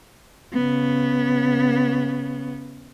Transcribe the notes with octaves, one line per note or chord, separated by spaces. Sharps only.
C#3 B3